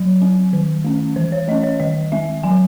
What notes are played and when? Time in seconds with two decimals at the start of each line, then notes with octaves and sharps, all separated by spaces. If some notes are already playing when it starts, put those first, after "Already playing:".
Already playing: F#3
0.22 C4
0.53 D#3
0.85 A3 C#4
1.16 E3 C5
1.32 C#5
1.48 A3 D#5
1.51 C#4
1.64 C#5
1.80 D#3 D#5
2.12 G#3 C4 E5
2.43 F#3 G#5